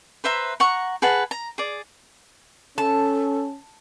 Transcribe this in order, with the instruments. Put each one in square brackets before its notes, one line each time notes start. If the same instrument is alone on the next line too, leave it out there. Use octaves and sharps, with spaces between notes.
[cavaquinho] B4 C5 E5 A#5
F#5 A#5 C#6
G#4 B4 F#5 A5
A#5
G#4 D5
[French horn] C#4 [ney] A4 [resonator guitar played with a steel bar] A5